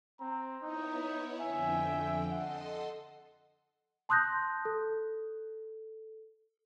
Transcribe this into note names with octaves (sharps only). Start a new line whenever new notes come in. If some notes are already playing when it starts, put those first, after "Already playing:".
C4 A#5
B3 D#4 E4 C#5
F2 D3 E5 G5 G#5
A4 D#5 F#5 C6
A5 C6 D#6 F#6 G6 A#6
A4